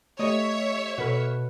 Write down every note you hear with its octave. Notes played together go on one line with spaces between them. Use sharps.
A3 G4 C#5 D#5 E5
B2 F#4 A4 B4 B5 F6